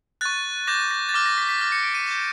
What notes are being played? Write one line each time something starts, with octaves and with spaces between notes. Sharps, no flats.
C#6 F#6 A6
D6 G6 A#6
A#6
A6
D6 F6 A#6
A#6
B6
B6
D6 F6
C#7
D7
D#7
D6 G6 E7